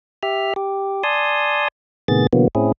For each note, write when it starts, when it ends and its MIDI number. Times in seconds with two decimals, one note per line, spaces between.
0.23 0.54 67
0.23 0.54 76
0.23 0.54 89
0.56 1.03 67
1.03 1.68 74
1.03 1.68 80
1.03 1.68 81
1.03 1.68 84
1.03 1.68 87
2.08 2.27 45
2.08 2.27 48
2.08 2.27 51
2.08 2.27 59
2.08 2.27 68
2.08 2.27 93
2.33 2.48 47
2.33 2.48 50
2.33 2.48 52
2.33 2.48 54
2.33 2.48 58
2.33 2.48 59
2.55 2.72 45
2.55 2.72 60
2.55 2.72 61
2.55 2.72 64
2.55 2.72 68